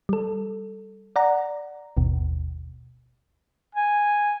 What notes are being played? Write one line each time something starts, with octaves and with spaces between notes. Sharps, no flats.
G3 A4
D5 F#5 A#5
G#1 D#2 B2
G#5